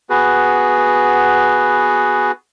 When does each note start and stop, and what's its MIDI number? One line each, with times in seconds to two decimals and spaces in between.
0.10 2.32 59
0.10 2.32 66
0.10 2.32 68
0.10 2.32 71